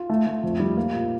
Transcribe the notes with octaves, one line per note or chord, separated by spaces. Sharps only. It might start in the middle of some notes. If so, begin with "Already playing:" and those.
Already playing: F4
A3
A3
F2
G3
A#3
A#2